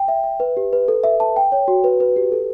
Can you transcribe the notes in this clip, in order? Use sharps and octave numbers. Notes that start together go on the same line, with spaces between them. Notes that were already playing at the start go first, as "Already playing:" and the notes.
Already playing: G5
E5
E5
B4
G4
B4
A4
E5
A5
G5
C#5
F#4
B4
B4
G4
A4